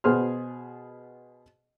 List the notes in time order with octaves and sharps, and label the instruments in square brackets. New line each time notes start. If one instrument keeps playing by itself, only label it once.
[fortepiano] B2 B3 G#4 C5 C6 F6